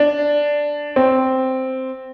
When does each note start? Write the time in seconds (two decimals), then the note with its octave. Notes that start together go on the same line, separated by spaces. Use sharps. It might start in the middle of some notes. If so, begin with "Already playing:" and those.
Already playing: D4
0.96 C4